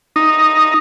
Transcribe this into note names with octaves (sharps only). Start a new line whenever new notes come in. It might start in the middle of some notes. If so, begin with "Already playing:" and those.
D#4